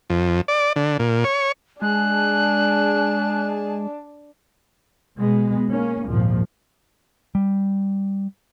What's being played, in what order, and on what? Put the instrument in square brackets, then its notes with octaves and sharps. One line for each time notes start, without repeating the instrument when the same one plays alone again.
[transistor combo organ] F2
D5
D3
A#2
C#5
[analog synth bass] G#3 [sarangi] D4 [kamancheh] G#4 A5 [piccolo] F#6
[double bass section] B2 G#3 B3
A#3 C#4
G#1 D#2 A#2 F3
[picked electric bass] G3